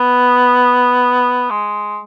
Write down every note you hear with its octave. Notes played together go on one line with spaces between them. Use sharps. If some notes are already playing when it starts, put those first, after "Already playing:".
Already playing: B3
G#3